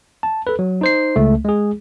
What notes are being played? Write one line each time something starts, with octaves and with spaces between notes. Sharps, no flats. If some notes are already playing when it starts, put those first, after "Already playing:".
A5
A4 B4
F#3
D#4 C5 C7
C#2 A3
G#3 G#4